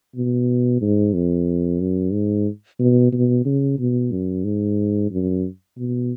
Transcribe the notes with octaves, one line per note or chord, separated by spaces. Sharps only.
B2
G#2
F2
F#2
G#2
B2
B2
C#3
B2
F#2
G#2
F#2
B2